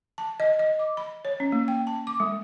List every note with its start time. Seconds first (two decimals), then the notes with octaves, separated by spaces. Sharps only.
0.18 A5
0.40 D#5
0.59 D#5
0.79 D6
0.97 B5
1.25 C#5
1.40 C#4
1.52 A#3
1.68 G5
1.87 A5
2.07 D6
2.20 G#3